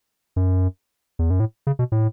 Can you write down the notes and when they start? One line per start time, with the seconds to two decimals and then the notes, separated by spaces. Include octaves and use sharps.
0.36 F#2
1.19 E2
1.30 F#2
1.40 A2
1.67 C#3
1.79 B2
1.92 A2